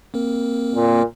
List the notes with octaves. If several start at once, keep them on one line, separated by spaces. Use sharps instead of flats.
A#3 C4 A#4
A#2